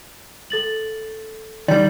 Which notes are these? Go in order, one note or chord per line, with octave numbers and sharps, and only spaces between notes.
A4 A6 F#7
D#3 G3 D5